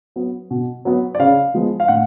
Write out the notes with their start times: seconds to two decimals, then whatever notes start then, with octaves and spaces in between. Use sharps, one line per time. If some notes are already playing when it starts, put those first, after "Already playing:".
0.16 F#3 B3
0.51 B2
0.85 F#3 B3
1.15 D5
1.19 C#3 F5
1.54 F3 G#3 B3
1.80 F5
1.88 A2 F#5